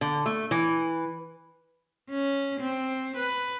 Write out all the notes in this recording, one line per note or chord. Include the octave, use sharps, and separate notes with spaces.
D3
A3
E3
C#4
C4
B4